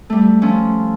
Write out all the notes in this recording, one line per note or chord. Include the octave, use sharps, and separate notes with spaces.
G3 A3
F3 A3 C#4